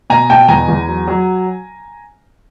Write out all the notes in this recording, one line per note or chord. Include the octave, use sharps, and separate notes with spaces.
B2 G#5 A#5
B2 G5 A5
E2 G#5 A#5
E2
F#3
F#3